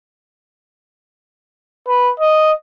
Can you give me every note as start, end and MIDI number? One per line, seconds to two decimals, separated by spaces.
1.88 2.11 71
2.20 2.52 75